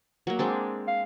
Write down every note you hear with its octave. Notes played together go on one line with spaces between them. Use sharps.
F#3 A#3
G#3 C4 D4
F5